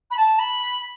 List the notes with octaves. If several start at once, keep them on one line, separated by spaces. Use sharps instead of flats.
B5
A5
B5